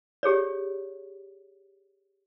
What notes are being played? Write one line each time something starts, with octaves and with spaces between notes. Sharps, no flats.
G4 G#4 C#5 D5